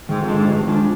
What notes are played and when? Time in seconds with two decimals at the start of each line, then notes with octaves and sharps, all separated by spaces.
0.08 G#2 D#3
0.22 F2
0.28 G#3 D4 F4
0.34 G#2
0.48 G2 D#3
0.60 F2
0.67 G#3 D4 F4